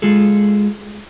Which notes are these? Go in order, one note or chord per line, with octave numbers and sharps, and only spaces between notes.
G#3 F4 G#4 A4